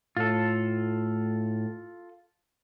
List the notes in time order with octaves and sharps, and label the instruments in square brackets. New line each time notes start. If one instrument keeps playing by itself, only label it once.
[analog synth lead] A2 [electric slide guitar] F4 A4